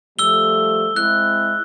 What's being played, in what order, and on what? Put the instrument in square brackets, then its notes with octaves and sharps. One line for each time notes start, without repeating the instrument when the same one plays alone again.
[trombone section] F3 G3 A3 [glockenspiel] E6 G7
[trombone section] G#3 C4 E4 [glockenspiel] F#6